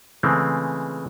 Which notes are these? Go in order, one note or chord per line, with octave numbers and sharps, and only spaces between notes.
C#3 E3 G#3 A3 C4